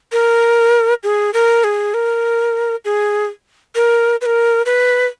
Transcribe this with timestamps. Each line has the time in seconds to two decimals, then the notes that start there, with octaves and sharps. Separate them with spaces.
0.12 A#4
1.03 G#4
1.33 A#4
1.64 G#4
1.94 A#4
2.85 G#4
3.75 A#4
4.21 B4
4.26 A#4
4.66 B4